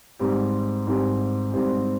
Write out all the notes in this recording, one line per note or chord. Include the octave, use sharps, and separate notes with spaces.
G#2 G3 C4 G4
G#2 G3 C4 G4
G#2 G3 C4 G4